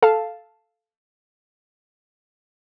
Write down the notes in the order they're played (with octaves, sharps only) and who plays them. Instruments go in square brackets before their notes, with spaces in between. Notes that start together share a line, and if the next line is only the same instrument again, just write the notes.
[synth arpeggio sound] A4 F5 A5